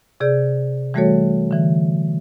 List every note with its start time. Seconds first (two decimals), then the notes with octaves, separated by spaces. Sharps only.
0.20 C3 G#4 D5 G6
0.94 E3 G3 A3 F#4 A4 C#5
1.51 D3 E3